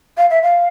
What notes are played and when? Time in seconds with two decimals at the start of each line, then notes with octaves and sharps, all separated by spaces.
0.17 F5
0.30 E5
0.43 F5